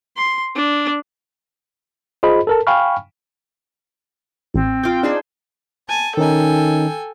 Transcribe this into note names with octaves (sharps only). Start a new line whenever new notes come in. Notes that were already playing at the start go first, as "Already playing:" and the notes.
C6
D4
F4 G#4 C5 D#5 B5
A4 A#4 A5
F5 G5 G#5 B5 C#6 F6
A1 C4
F4 G5 D6
D4 D#4 G#4 C5
G#5 A5
D#3 C#4 D#4 A4 G5 G#5